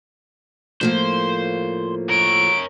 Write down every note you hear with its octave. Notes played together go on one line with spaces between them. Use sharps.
A2 F3 A#3 C5
A#4 C#5 D7